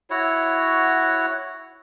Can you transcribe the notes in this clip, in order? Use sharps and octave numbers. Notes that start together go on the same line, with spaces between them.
E4 F#4 C#5 F#5